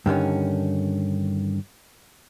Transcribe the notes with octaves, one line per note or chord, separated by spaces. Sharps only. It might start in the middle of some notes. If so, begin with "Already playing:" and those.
G2 D3 D#3 C#4